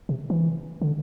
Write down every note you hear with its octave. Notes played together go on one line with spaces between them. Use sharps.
C3
E3
D3